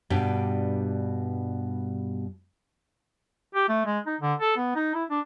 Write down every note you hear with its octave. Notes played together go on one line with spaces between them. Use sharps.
G2 B2 G3 D4
G4
A3
G#3
D#4
D3
A4
B3
D#4
E4
D4